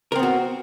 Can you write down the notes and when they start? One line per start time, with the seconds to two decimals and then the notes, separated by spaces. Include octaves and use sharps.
0.12 A#4
0.16 C4
0.19 B3
0.23 F#4